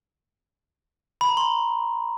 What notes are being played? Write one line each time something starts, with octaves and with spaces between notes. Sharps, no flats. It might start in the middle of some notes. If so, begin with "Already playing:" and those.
B5
A#5
C6